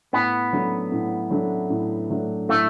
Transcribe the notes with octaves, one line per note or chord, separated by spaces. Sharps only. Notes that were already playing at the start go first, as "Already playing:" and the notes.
A2 B3
F#3 A3 D4
A2
F#3 A3 D4
A2
F#3 A3 D4
A2 A3